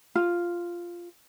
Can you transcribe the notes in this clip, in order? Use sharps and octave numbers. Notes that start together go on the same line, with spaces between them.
F4